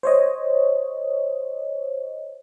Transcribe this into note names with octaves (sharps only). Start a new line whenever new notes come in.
C5 C#5 D#5